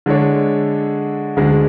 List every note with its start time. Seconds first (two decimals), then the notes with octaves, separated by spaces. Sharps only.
0.06 D3 G#3 D4 A4 C#5
1.37 D2 D3 G#3 D4